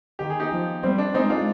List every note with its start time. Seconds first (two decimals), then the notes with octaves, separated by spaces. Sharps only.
0.19 D#3 G4
0.30 G#4
0.40 D#4 G4
0.51 F3
0.83 G3 C4
0.98 D4
1.14 G#3 C4 D#4
1.30 D4 F4